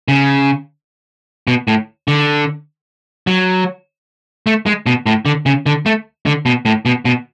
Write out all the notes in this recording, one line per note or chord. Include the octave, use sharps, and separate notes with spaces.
C#3
B2
A2
D3
F#3
A3
G#3
B2
A2
D3
C#3
D3
A3
D3
B2
A2
B2
B2